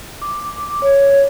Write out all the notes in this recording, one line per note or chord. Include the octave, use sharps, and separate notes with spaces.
D6
C#5